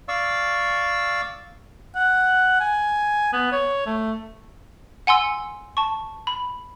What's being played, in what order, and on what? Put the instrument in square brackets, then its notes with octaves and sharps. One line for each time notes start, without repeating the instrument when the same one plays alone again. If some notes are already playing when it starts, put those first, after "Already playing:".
[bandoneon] D5 F5 C#6 E6
[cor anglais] F#5
G#5
B3
C#5
A3
[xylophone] F#5 G#5 C6 E6
A5 C#6
B5